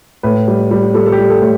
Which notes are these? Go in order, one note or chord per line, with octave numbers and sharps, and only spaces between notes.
A2 B4
G3
G3
G3 A4
A4
G4
G3
A4
A2